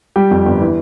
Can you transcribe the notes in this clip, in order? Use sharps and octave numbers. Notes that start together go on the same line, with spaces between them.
G3 G4
F2
G1
E3